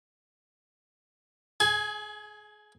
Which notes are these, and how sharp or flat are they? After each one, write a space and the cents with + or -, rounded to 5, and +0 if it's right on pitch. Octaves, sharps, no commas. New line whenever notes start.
G#4 +30 G#5 +0